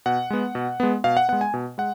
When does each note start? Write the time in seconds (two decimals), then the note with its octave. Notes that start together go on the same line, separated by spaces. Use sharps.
0.06 B2 F#5
0.30 G#3 B3
0.55 B2
0.80 G#3 B3
1.04 B2 F5
1.17 F#5
1.29 G#3 B3 F#5
1.41 G#5
1.54 B2
1.78 G#3 F#5